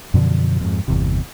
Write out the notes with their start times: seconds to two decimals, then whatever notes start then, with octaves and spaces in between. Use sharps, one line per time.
0.14 F#2 B2 D3 F3
0.61 F2 G#2
0.88 G1 E2 C3